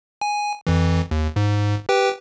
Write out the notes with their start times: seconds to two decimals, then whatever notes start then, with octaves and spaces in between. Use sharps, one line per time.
0.21 G#5
0.67 F2 E3
1.11 D#2
1.36 G#2
1.89 G4 B4 G5